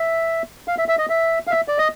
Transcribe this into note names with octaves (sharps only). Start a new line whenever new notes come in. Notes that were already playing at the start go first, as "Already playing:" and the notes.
Already playing: E5
F5
E5
E5
D#5
E5
F5
E5
D5
D#5